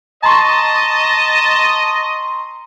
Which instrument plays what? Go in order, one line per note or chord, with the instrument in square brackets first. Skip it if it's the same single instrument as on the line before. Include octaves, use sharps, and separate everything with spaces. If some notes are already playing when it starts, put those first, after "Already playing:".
[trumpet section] D#5 [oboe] A5 [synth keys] A#5 C6 C#6